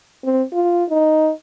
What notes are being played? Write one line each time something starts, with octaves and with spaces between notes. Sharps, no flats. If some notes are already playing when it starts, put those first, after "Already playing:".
C4
F4
D#4